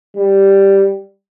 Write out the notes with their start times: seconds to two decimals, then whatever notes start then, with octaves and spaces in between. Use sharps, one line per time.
0.17 G3